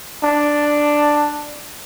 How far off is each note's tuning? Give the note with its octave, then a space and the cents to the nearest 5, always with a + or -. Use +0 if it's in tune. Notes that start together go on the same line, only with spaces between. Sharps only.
D4 +5